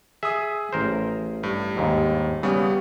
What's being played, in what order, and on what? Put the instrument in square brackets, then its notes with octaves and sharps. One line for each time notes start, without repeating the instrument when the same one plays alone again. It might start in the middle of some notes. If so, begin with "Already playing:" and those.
[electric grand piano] G#4 D#6 [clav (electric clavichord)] E5
[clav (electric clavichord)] A1 A#4 C5
[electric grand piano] G2
[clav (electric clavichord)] D#2 G#2
[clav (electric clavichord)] C#3 [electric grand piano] G3 B3